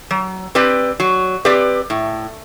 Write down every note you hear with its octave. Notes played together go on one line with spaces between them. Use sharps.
F#3
C4 G4 B4 D5
F#3
C4 G4 B4 D5
A2